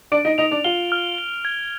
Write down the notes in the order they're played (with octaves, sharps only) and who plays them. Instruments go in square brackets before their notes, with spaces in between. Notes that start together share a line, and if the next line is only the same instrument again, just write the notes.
[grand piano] D4 D5 [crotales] D7
[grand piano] D#4 D#5
[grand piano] D#4 D#5 [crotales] F7
[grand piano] D4 D5
[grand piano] F4 F5 [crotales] G7
[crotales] F6
G7
G#6